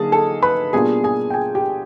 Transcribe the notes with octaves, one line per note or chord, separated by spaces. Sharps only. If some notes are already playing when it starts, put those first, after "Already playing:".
Already playing: D3 F#3 A#3 D#4 G#4 A5
A4 A5
B4 B5
B2 G3 A#3 D4 F4 G#4 G#5
G#4 G#5
G5
G#4 G#5
G4 G5